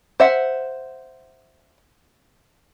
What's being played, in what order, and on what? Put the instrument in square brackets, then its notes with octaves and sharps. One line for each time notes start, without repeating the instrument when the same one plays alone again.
[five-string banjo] C5 E5 F#5